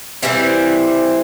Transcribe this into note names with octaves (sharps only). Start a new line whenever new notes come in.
C3 E3 G3 C4 E4